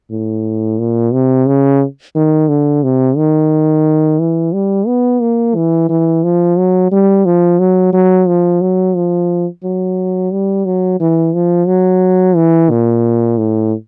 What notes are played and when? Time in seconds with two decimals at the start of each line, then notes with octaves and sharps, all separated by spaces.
0.11 A2
0.79 A#2
1.13 C3
1.47 C#3
2.16 D#3
2.49 D3
2.83 C3
3.17 D#3
4.20 E3
4.54 G3
4.87 B3
5.21 A#3
5.55 E3
5.89 E3
6.24 F3
6.57 F#3
6.92 G3
7.25 F3
7.59 F#3
7.93 F#3
8.28 F3
8.61 F#3
8.96 F3
9.64 F#3
10.31 G3
10.65 F#3
11.00 E3
11.34 F3
11.67 F#3
12.36 E3
12.70 A#2
13.38 A2